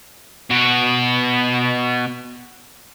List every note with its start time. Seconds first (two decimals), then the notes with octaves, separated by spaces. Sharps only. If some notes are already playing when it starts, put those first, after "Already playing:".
0.50 B2 F#4